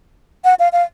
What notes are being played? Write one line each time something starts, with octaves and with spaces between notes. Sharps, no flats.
F#5
F5
F5